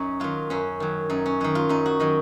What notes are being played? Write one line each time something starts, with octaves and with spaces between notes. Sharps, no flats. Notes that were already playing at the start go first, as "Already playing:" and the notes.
Already playing: F#2 C#4 D#4
D#3 F#3 F4
F#2 C#4
D#3 F#3
F#2 D#4
C#4
D#3 F#3 D#4
F4
F#2 D#4
F#4
D#3 F#3 D#5